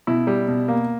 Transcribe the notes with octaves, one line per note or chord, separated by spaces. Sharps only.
B2 E4
G3
B2
A#3